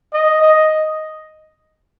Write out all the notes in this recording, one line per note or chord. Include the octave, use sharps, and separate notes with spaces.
D#5
D#5